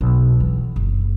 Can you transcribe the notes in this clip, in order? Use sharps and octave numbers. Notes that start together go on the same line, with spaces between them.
B1
E3
F#1